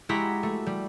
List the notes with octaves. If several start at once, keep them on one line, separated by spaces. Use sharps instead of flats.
G#3 E4 F#4 G4 A#5 B6
A3
G3